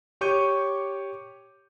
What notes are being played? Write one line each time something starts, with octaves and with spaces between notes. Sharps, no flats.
G4 C#5 C#6 D6 G6 D#7